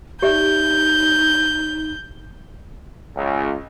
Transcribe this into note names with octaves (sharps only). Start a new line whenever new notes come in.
D#4 G4 D5 E5 G6
C#2